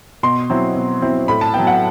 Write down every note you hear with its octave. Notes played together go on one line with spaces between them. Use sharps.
B2 C6
F#3 C4 E4
B2
F#3 C4 E4
A2 B5
A5
F#3 B3 G5
F#5